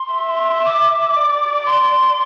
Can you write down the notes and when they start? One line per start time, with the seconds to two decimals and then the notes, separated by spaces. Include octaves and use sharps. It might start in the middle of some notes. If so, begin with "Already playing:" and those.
Already playing: C6
0.14 E5
0.65 D6
1.16 D5
1.66 C6